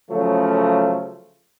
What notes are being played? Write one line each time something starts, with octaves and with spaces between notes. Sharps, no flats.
C#3 F3 F#3 A3